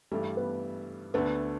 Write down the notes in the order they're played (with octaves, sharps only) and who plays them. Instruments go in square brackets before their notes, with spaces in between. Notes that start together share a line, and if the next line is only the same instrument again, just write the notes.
[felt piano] G2 E3 G3 [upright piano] A3
[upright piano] B3
[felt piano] D2 D3 A3 D4 [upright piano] B3